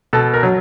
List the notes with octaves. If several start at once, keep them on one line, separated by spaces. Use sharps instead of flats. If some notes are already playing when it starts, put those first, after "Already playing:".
B2 A4
A#4
F#3